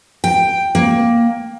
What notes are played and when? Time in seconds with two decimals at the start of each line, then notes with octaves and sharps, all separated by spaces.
0.24 G5
0.75 A#3